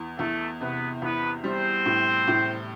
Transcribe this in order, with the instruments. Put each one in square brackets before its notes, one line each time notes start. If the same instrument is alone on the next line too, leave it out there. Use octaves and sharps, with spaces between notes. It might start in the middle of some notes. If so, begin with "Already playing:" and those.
Already playing: [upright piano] E2
[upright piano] E2 [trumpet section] A3 A4
[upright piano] C3 [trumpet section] B3 B4
[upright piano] E2 [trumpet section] B3 B4
[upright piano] G3 [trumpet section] C4 C5
[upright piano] A2
A2